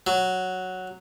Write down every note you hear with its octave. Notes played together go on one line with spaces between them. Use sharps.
F#3